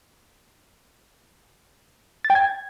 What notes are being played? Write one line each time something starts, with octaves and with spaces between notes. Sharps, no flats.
A6
G5
G#6